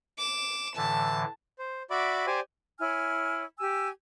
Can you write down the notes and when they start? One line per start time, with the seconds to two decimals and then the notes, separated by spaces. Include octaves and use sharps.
0.18 D6 E7
0.76 A2 D3 E3 A5
1.59 C5
1.90 F#4 D5 E5 B5 D6
2.27 G4 C5 D5 G#5
2.80 E4 C#5 G#5 F6
3.58 G4 G#5 E6